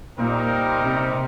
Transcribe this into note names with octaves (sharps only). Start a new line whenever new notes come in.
A#2 G3 C4 D#4 G4 A#4
C3